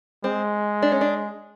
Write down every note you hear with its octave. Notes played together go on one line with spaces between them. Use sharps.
G#3 C4
D4
C#4
D4